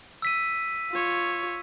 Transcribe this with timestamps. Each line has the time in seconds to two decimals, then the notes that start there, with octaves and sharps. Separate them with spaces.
0.22 E6 B6 D#7
0.91 F4 C#5